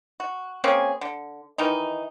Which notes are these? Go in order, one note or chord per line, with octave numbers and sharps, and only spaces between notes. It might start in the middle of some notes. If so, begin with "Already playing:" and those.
F#4
A#3 C4 C#4 G#4
D3
D#3 E3 D#4